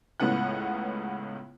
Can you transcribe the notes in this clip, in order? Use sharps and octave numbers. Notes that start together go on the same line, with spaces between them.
C#2 A2 C#3 B3 F#5 F#6